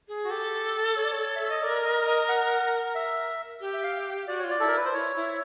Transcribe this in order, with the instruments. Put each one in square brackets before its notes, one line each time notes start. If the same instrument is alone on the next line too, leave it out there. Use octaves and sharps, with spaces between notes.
[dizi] G#4
[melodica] F#4
[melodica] G4 [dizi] A4
[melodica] C#5
D5
C#5
E5
D#5
[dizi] A#4 [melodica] D5
[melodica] D#5
D#5
F#5
E5
[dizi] G4
[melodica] E5
F5
[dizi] F#4 [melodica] D5
[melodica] C#5
[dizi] F4
[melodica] D5
[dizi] E4 [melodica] A4
[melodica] A#4
B4
C5
[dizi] E4 [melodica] C#5
[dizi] E4